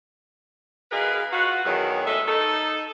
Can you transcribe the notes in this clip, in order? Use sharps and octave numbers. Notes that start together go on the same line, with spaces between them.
F#2 G#4 A#4 B4 D#5 F5
F4 F#4 B4 F5 F#5
E2 D#3 F#3
G#3 A3 D#4 A4 E5
D#4 A4